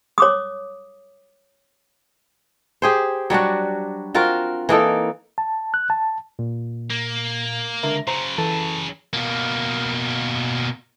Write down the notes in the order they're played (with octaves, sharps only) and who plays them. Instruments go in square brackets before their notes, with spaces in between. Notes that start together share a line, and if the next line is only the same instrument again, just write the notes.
[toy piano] C#5 D6 D#6
[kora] G4 G#4 C5
F#3 G3 D4 F#4
C4 F4 F#4 A#4
E3 A#3 D#4 A4
[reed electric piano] A5
F#6
A5
[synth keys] A#2
[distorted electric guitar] A#3
[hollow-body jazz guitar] C#2 D3 A#4 [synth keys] E5
[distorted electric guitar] C#3 F#3 [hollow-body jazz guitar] C5 [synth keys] A#5
[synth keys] E3 [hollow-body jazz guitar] A4
[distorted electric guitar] B2 A#3